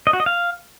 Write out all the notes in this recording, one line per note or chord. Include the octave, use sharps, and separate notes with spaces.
D#5
F#4
D#5
F5